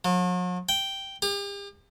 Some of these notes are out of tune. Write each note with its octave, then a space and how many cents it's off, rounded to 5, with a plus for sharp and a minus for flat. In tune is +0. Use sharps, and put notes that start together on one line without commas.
F#3 -45
G5 -5
G4 +40